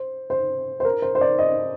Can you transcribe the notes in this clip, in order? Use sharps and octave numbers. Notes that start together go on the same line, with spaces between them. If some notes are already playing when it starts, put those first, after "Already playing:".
Already playing: C5
C5
C5
A#4
C5
C5
D5
D#5